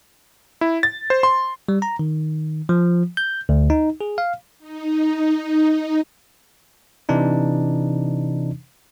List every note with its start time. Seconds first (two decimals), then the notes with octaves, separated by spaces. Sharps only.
0.61 E4
0.83 A6
1.10 C5
1.23 C6
1.69 G3
1.82 A#5
1.99 D#3
2.69 F3
3.17 G6
3.49 D2
3.70 D#4
4.01 G#4
4.18 F5
4.59 D#4
7.09 C3 E3 D4 D#4